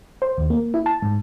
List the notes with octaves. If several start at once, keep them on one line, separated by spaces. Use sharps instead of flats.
C5
D#2
A#3
E4
A5
G#2